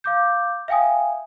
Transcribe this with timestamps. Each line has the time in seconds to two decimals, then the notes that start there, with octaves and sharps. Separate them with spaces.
0.04 F5 D6 G6
0.68 E5 F5 G5 G#5 D#6